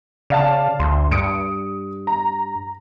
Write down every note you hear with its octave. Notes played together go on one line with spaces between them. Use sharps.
C#3 D5 F5 A5
D2 C6
G2 D#6 C#7 D7
A#5